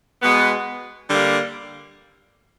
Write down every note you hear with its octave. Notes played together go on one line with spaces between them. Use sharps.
B2 G#3 B3
D3 G3 A#3